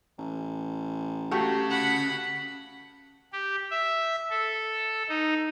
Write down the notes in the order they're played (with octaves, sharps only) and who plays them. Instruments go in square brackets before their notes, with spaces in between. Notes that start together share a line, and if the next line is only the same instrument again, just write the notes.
[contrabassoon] A1
[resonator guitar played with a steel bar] A3 F#4 G4 [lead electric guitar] C#4 F5
[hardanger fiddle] F#5 B5
[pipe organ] G4
E5
A4
D#4